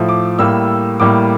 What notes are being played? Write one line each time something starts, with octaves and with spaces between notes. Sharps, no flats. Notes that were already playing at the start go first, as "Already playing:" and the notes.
Already playing: A2 F3 A3
D6
A2 G3 A#3 E6
A2 G3 A#3 D6